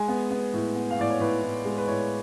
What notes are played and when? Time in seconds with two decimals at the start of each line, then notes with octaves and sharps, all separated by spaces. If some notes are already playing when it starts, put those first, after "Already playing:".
Already playing: G#3 G#5
0.08 B3
0.31 B3
0.54 A2
0.76 B3
0.91 F5
0.99 A2 D5
1.10 C#5
1.20 A2 B4
1.43 A2
1.65 G#3
1.78 B4
1.88 A2 C#5